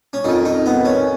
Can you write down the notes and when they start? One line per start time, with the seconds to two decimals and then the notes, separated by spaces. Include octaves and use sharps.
0.13 C#4
0.24 F2 D#3 D#4
0.45 D#4
0.66 B3
0.85 C#4